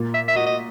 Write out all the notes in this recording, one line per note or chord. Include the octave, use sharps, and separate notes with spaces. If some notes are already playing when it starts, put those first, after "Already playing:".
Already playing: A#2
E5
E5
F#4 D#5
D#5